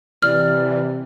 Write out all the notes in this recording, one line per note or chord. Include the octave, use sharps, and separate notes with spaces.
C3 E3 D5 F6